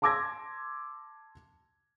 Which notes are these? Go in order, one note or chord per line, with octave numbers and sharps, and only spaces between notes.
A5 C6 D6 E6 G#6 A#6